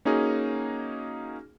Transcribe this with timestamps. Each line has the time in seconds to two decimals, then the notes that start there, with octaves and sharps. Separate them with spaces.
0.05 A#3 C#4 D#4 F#4 G#4